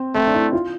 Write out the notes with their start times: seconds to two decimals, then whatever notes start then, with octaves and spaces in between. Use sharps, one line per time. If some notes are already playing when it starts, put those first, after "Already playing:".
Already playing: C4
0.15 A3 C4
0.27 D4
0.35 E4
0.53 F4